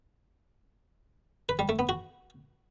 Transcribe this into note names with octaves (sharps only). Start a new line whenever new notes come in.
B4
G3
A3
B3
F#4